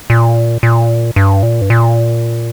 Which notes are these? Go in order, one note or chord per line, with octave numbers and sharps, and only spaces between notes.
A#2
A#2
G2
A#2
G2
A#2